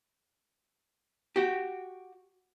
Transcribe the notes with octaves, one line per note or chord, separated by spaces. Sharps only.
F#4 G4